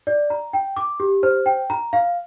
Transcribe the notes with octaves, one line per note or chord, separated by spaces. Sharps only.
D5
A#5
G5
D6
G4
C5
G5
A#5
F5